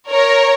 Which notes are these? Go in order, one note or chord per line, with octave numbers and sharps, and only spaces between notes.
A#4 C#5